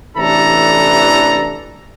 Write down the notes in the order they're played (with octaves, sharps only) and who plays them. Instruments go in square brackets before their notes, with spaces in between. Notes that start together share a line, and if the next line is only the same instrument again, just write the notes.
[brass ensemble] A1 C3 E3 D4 A4 A#5